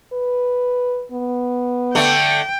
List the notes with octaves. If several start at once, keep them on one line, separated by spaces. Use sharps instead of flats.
B4
B3
D3 A3 G5